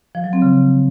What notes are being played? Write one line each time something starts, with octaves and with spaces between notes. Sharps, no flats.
F3
F#3
C4
C#3